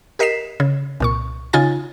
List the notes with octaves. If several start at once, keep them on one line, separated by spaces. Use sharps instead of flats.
G4 A#4 D#5 B6 C7 E7
C#3
C2 A#2 C#6
C#3 D#4 F4 G#5 A6